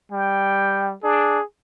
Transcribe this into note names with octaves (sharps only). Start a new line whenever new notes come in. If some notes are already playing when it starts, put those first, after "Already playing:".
G3 G5
D4 G#4